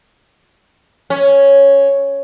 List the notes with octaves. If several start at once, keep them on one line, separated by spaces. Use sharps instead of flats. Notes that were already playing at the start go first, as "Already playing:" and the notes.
C#4